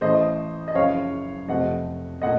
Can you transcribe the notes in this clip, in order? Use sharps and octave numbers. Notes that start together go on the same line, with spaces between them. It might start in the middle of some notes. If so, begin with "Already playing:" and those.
A1 A2 A3 C5 D#5
D#5
F#1 F#2 C#3 F3 C#5 F5
F1 F2 C3 F3 A3 D#5 F#5
A#2 A3 D#5 F#5